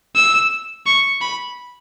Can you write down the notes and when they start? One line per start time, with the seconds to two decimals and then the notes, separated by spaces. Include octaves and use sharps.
0.16 E6
0.86 C#6
1.21 B5